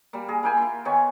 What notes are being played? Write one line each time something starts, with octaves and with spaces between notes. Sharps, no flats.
G3 A#3
G#4 A#4
A#3 E4 G5 G#5
E4 F4
D#3 B3 C#5 G#5